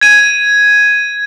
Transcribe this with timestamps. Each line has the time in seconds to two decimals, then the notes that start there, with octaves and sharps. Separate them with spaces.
0.01 G#6 D#7